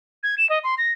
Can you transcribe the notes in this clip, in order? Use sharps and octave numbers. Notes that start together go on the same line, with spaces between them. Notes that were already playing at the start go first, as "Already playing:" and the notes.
G#6
E7
D#5
C6
A#6